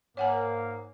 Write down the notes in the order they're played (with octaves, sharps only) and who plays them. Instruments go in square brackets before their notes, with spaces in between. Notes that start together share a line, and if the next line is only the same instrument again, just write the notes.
[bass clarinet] G#2 [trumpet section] A#3 [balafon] C#5 F#5 G#5